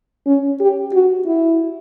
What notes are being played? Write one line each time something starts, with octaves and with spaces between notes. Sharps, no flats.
C#4
G4
F#4
E4